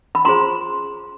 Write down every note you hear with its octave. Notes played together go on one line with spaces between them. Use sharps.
B5
C#4 F4 G#4 C5 A#5 C6